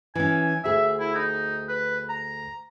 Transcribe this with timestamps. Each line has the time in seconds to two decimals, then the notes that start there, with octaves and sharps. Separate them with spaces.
0.15 E3 C#4 G#5
0.64 D2 G#4 E5
1.00 E4
1.15 D#4
1.69 B4
2.10 A#5